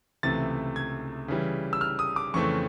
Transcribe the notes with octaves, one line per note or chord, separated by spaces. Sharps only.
C#2 C3 E3 A3 A6
G#6
C#3 E3 G3
E6
F6
D#6
D6
F2 C#3 E3 A3 C4 C#6